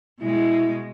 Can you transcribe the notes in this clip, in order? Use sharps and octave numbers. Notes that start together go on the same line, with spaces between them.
B2 G#3 E4